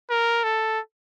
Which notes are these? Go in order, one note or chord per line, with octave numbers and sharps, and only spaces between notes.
A#4
A4